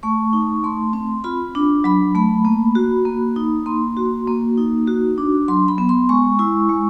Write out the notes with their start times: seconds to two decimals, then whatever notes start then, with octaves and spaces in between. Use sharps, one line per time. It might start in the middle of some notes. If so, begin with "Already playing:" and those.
0.03 A3 C#6
0.33 D#4
0.64 A3 C6
0.93 C4
1.24 F4 B5
1.55 D4
1.84 F#3 B5
2.14 A3 B5
2.45 A#3
2.75 F#4
3.05 A#3
3.36 D#4
3.66 A#3 C6
3.97 F#4
4.28 A#3
4.58 D#4
4.88 F#4
5.18 D4
5.48 F#3 C6
5.68 B5
5.78 B3
5.89 C6
6.09 G#3 C#6
6.39 E4
6.69 G#3